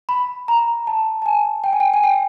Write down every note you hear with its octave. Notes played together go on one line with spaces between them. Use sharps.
B5
A#5
A5
A5
G#5
G5
G#5
G5
G#5
G5